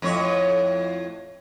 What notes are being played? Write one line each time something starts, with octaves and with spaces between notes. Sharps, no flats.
F2 A2 C#5